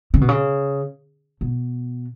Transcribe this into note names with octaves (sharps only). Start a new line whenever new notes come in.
C#3
B2
C#3
B2